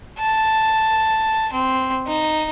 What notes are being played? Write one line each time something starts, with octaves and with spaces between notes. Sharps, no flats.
A5
C4
D#4